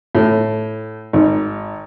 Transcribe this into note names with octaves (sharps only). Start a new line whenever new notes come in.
A2
G#1